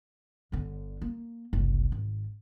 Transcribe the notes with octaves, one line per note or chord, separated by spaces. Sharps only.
G1 D3
A#3
F#1 C2
G#1